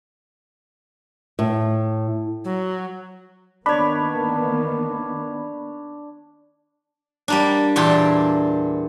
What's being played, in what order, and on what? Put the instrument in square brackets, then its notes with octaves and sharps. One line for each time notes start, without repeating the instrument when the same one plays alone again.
[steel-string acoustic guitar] A2
[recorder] F#3
[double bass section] D#3 A#3 B3 [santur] D4 C#5 [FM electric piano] B5
[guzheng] G3 A#3 D4
E2 A#2 D4 E4 G5